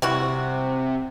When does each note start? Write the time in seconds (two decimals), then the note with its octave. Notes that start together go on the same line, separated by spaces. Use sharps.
0.02 C3 G3 E4 F#4